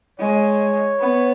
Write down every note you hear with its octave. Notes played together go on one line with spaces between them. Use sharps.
G#3 C#5
B3